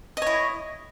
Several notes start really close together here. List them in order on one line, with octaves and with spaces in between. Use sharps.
D#5 C#5 E4